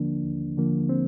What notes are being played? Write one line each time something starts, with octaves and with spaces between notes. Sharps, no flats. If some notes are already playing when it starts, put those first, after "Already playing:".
Already playing: D#2 D3 F3 A#3 D4
D#2
D3 F3 A#3
C4